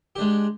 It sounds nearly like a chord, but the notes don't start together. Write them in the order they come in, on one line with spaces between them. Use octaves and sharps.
G4 D4 G#3